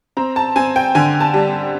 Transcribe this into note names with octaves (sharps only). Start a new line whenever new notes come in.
C4 A#5
A5
C4 G#5
G5
D3 G#5
A5
G3